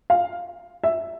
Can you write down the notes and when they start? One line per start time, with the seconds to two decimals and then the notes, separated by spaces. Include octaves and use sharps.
0.10 F5
0.84 E5